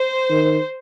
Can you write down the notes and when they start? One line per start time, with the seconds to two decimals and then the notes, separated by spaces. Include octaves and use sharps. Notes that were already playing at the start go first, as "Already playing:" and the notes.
Already playing: C5
0.30 D#3